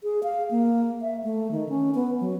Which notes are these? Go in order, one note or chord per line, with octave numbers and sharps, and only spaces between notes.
G#4
F5
A#3
E5
A3
D#3
C#4
B3
F#3